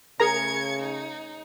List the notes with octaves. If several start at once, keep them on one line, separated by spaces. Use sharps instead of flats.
C#3 A3 G#4 A#4 A#5 G#6 C#7
D#4